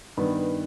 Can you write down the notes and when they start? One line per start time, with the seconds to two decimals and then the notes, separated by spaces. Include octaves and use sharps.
0.17 G2 D#3 B3